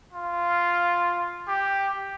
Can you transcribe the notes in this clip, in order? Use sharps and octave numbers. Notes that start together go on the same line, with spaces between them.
F4
G4